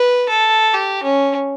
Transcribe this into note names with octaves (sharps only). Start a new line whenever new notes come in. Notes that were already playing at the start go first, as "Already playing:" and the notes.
Already playing: B4
A4
G4
C#4